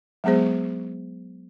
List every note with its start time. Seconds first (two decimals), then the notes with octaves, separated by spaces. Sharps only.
0.24 F#3 G#3 B3 G#4 C5